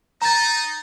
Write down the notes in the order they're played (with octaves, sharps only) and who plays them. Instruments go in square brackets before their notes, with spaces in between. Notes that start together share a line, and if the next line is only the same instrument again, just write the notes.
[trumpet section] D#4 [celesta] A#5 A6